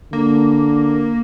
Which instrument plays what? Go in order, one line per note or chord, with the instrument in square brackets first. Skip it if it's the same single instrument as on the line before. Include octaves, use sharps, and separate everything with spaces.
[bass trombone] D3 [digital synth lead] A#3